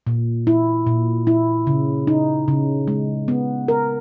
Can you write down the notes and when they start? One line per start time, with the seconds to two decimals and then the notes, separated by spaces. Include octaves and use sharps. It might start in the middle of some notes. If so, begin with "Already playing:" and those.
0.07 A#2
0.47 E4
0.87 A#2
1.27 E4
1.67 C#3
2.07 D#4
2.48 C#3
2.88 G#3
3.28 B3
3.68 A#4